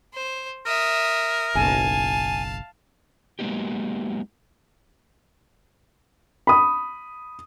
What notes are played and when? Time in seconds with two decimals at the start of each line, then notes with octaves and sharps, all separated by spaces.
0.13 C5
0.66 A#4 E5 D#6
1.55 F#1 B1 F5 G#5 A5
3.39 F#3 G#3 A#3 B3 D#4 G4
6.47 B5 D#6